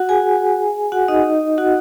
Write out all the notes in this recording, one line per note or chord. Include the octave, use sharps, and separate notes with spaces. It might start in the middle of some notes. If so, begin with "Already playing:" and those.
Already playing: F#4 F#5
G#4 G#5
F#4 F#5
D#4 D#5
F#4 F#5